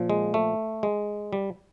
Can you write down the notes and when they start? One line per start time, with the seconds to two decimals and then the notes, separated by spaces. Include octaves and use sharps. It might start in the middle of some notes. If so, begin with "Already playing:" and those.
Already playing: A#2 F3
0.10 G#3
0.34 A3
0.83 G#3
1.33 G3